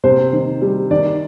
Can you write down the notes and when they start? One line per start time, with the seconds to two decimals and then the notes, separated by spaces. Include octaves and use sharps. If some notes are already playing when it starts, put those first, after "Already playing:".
0.04 C3 C5
0.33 D#3
0.62 G3
0.91 D#3 D5